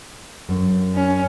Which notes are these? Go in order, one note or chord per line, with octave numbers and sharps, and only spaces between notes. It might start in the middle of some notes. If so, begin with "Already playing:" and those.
F#2
C#4